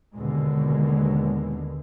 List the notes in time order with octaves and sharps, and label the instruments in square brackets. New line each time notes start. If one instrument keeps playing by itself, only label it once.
[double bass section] D#2 B2 D3 G#3